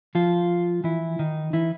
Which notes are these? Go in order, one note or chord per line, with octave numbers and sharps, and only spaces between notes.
F3 F4
E3 E4
D#3 D#4
E3 E4